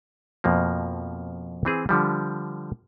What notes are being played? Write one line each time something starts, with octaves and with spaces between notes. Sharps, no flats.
F2 B2 F3 A#3
E3 C4 G#4
D3 F3 G3